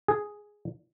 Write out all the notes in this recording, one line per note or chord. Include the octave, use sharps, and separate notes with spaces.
G#4